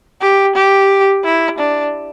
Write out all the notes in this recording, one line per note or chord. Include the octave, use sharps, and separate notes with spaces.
G4
G4
E4
D4